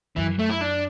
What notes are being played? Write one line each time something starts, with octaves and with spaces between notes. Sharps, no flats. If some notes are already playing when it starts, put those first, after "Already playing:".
F#2 E3
A3
E4
D4